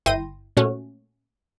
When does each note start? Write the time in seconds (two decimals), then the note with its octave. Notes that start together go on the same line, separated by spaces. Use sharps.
0.06 G1 E4 G5 C6 A#6 D#7
0.57 A#2 A3 C#4 F#4